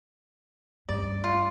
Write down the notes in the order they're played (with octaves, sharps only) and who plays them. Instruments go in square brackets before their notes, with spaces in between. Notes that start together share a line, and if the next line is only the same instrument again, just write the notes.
[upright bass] G2 C#4 [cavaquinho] D5
[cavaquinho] F4